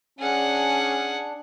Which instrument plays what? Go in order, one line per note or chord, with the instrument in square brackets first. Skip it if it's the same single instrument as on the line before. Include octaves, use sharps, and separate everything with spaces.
[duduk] C#4 [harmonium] D4 [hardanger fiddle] G#4 F#5